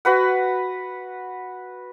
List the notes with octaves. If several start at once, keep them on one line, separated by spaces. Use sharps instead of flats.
F#4 B4 F#5